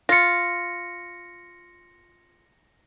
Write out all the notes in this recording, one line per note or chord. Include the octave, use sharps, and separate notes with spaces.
F4 A#6 C#7